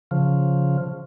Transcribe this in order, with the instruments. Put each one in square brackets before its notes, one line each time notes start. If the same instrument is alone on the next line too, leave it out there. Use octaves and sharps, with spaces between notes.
[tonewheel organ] C#3 F3